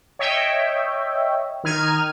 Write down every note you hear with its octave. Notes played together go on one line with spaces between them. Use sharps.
C#5 D#5 E5 G5
D#3 D#4 F6 G#6 D#7